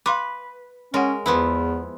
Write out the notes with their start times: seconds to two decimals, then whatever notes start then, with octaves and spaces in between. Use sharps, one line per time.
0.06 B4 F5 C6 D6
0.94 G#3 C#4 A#4 C#5 F#5
1.26 E2 F3 B3 E4